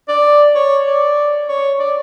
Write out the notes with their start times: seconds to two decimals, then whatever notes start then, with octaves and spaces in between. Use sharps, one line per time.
0.09 D5
0.55 C#5
0.86 D5
1.49 C#5
1.80 D5